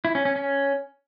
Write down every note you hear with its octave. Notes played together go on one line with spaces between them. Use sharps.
E4
C#4
C#4
C#4